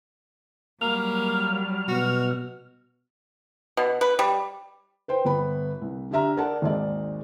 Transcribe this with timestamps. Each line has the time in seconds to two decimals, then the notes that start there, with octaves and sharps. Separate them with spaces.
0.81 F#3 G3 A#3 F6
1.88 B2 F#4
3.77 B2
4.01 B4
4.19 G3
5.08 B4 C5 G5
5.25 G1 B3 B5
5.81 C2
6.11 D3 D4 G4 E5 A#5 F6
6.37 A4 A#4 D5 F#5 A5
6.62 G#1 D#2 G#3 D5 D#5